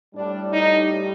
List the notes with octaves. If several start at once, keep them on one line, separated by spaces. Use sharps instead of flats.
A2 G3 D4
D#4